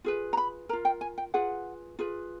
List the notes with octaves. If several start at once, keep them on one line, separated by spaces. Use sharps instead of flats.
F4 G#4 B4
A#5
B5
F4 A#4 A#5
G5
G#5
G5
F4 G#4 B4 F#5
F4 G#4 B4